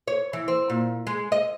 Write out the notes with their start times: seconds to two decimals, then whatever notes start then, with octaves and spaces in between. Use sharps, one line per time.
0.08 C#5
0.33 E3
0.48 C4
0.70 A#2
1.07 G#3
1.32 D#5